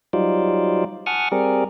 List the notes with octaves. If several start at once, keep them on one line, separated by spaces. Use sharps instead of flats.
F#3 G3 D#4 F4 C5 D5
F#5 G#5 A5 C#6 D#6 F6
G3 C4 G#4 A#4 D5